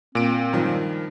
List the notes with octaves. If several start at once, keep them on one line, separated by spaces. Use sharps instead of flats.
A#2 C4 D7
G2 D#3 F3